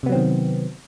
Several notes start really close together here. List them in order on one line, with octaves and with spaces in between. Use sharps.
C3 B3 F#3 C4 D#3